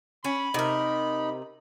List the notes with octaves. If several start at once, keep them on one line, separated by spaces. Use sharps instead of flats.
C#4 B5
C3 D#4 A#4